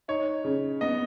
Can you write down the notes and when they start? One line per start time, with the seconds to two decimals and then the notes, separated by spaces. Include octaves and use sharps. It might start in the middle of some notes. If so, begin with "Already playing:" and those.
0.08 D#4 C#5
0.44 C#3
0.81 B3 D#5